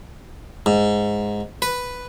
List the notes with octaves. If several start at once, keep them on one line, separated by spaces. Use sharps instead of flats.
G#2
B4